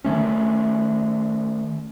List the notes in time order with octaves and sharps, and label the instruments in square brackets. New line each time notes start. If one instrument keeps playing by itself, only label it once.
[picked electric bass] D#3 F3 A3 C#4